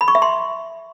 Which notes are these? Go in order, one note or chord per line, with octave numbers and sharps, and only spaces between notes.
B5
C#6
E5
C6